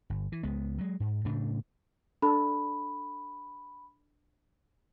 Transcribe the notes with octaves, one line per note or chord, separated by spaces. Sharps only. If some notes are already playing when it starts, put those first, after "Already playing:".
G1
E3
C#2 G#3 B3
F#3 G#3
G#2
A2 C#3 A3 D4
D4 A4 B5